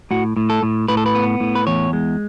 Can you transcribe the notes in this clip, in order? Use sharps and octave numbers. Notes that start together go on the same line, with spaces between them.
A2 F#4
A2
A4
A2
A2 B4
A4
B4
B3
A2
B4
E2 C#5
G#3